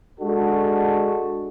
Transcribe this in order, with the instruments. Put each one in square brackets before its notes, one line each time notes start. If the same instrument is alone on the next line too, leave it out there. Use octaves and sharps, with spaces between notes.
[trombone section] G#3 D4 F#4 A4